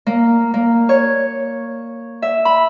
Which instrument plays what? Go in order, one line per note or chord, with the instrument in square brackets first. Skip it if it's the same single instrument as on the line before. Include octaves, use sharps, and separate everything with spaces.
[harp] A#3
A#3
C#5
E5
B5